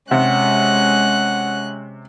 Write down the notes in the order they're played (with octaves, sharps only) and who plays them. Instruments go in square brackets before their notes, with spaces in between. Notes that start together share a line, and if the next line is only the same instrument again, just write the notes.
[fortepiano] C3 [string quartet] G#3 C#4 F#6 [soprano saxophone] F#5